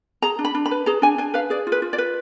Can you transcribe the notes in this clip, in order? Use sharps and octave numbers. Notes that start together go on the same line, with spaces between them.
G#4 A#5
D4
B5
D4
B5
B4
G#4 A#5
D4 G#5
D4 G#5
B4 F5
G#4 D5
F4
B4
F4
D5
B4